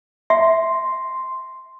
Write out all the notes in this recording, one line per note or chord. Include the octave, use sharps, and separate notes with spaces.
E5 C6